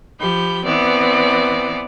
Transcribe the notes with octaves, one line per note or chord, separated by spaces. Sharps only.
F3 G4 B5 G6
E3 B3 C4 D5